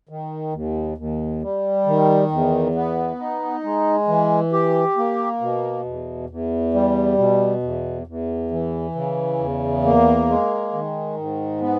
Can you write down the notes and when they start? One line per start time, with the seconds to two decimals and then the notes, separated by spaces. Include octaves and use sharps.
0.09 D#3
0.53 D#2
0.98 D#2
1.42 G3
1.86 D#3
2.31 E2
2.75 B3
3.19 D#4
3.64 G#3
4.08 E3
4.53 G4
4.97 A#3
5.41 B2
5.85 E2
6.30 E2
6.74 G3
7.18 B2
7.63 E2
8.07 E2
8.51 E3
8.95 C#3
9.39 E2
9.84 A#3
10.29 G#3
10.73 D#3
11.17 G#2
11.61 B3